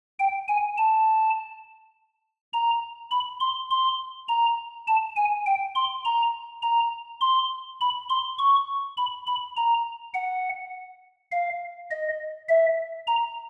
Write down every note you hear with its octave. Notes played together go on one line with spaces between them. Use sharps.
G5
G#5
A5
A#5
B5
C6
C6
A#5
A5
G#5
G5
C6
A#5
A#5
C6
B5
C6
C#6
B5
B5
A#5
F#5
F5
D#5
E5
A#5